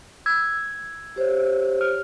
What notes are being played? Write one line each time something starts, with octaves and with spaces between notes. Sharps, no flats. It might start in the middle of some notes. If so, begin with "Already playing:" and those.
E6 G#6
G4 C5 C#5
F6